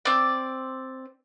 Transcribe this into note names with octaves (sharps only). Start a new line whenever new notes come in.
C4 D5